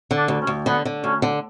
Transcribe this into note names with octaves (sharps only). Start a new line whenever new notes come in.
D3
D4
D2
C#4
D2
D3 B3
D3
D2 C#4
D3